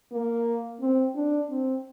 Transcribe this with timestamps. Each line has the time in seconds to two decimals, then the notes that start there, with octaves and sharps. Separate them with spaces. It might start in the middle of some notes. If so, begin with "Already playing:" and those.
0.12 A#3
0.80 C4
1.15 D4
1.50 C4